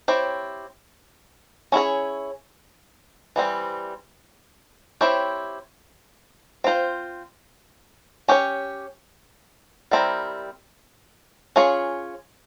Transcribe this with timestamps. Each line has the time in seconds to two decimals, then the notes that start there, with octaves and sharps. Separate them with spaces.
0.08 C4 E4 G4 C#5
1.72 C#4 E4 G#4 C#5
3.36 E3 G3 C4
5.01 C4 E4 G4 C#5
6.64 C4 F4 C5
8.28 C#4 G4 C#5
9.91 G3 C4 E4 A#4
11.56 C#4 F4 G#4 C#5